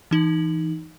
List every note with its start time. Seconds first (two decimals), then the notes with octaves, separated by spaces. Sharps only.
0.11 E3 D#4 F#7